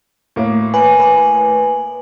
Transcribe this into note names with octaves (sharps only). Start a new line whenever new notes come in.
A2 A#3
B4 G#5
B4